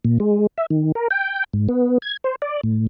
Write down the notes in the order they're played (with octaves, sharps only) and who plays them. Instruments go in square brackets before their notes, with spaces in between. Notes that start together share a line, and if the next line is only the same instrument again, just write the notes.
[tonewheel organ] A#2
G#3
E5
D#3
A#4
G5
G#2
B3
G#6
C5
D5
A2